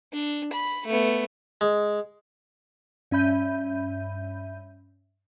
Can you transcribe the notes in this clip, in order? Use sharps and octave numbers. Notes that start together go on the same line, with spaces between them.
D4
B5
A3 B3
G#3
G2 C#4 E5 B5 G6 D#7